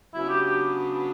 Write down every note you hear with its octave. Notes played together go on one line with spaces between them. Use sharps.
C#3 F#3 B3 D4 E4
G4
G4